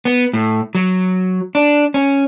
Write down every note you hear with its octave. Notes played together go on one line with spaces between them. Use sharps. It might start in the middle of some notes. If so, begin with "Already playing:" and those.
B3
A2
F#3
D4
C#4